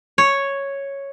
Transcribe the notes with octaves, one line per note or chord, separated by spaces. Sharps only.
C#5